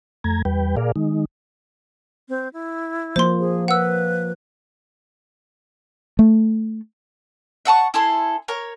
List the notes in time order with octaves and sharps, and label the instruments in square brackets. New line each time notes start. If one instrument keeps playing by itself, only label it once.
[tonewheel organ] F2 A3 A#5 G#6
E2 G3 B4 G5
A#2 G#4 A#4 D5 F5
D#3 G#3 D#4
[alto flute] C4
E4
[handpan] F3 A#3 [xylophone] C5 C6
[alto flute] G#4
[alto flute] B4 [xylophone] F#5 E6
[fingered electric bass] A3
[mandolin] E5 F#5 A5 C#6
E4 G#4 A4 C6
A#4 C#5